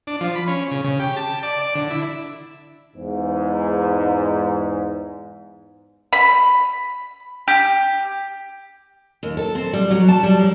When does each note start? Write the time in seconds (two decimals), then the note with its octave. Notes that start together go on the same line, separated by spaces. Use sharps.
0.07 D4
0.21 F3
0.36 B5
0.48 C#4
0.71 C#3
0.84 C#3
1.00 G4
1.17 A5
1.43 D5
1.61 D5
1.75 D3
1.91 E4
2.95 E2 G#2
6.13 B5
7.48 G4
9.23 D#2
9.37 A4
9.55 C4
9.73 G3
9.90 F#3
10.08 A5
10.23 G3
10.39 F#3